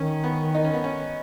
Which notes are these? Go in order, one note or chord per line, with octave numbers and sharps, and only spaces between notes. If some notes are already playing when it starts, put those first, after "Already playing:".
Already playing: D#3 C#4
B3
D#4
C#4
B3
C#4